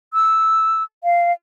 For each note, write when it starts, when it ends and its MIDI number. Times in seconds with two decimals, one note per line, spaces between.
0.14 0.83 88
1.04 1.32 77